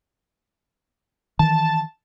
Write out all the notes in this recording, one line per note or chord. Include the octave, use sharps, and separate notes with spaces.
D#3 E3 A5